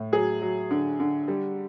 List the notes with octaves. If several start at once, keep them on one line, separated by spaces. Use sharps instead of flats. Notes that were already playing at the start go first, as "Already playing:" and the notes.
Already playing: A2
F#3 G#4
F#3
D3
D3
G3